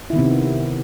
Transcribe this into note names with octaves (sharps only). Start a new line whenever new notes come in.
C3 D#3 B3 E4